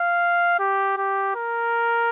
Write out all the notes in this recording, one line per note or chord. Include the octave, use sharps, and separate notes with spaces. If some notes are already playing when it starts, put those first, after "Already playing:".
Already playing: F5
G4
G4
A#4